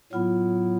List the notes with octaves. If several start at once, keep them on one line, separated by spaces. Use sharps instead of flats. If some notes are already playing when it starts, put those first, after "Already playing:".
A2 F#3 B3 E4 F4